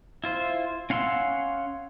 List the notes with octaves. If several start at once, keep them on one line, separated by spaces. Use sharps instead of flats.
E4 F4 C5
C#4 F5 F#5 C6 E6